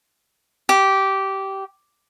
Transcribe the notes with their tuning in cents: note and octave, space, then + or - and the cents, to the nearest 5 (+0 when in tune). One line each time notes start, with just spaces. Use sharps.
G4 -15